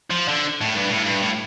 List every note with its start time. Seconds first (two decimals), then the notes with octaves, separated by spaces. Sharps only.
0.11 F3
0.28 D3
0.61 A2
0.75 G2
0.89 A2
1.03 G2
1.22 A2